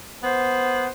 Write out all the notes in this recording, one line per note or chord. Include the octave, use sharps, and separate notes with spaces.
B3 C5